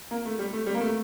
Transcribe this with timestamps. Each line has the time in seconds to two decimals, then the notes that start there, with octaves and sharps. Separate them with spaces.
0.11 A#3
0.25 A3
0.39 G3
0.53 A3
0.66 G3
0.74 A#3
0.81 A3